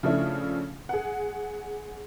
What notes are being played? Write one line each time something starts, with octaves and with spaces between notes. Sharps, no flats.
C#3 F3 A3 D4 E4
G#4 F#5